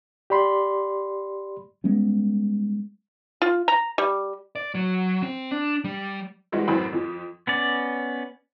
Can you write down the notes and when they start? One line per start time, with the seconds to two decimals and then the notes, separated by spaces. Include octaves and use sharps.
0.30 G4 D5 B5 C6
1.84 G3 G#3 B3 C#4
3.42 F4
3.68 A#5
3.98 G3
4.55 D5
4.75 F#3
5.22 C4
5.51 D4
5.84 G3
6.52 E3 G3 G#3 C4 F#4
6.68 F#2 A2 E3 C4 B5
6.93 F2 F3
7.47 B3 C#4 D5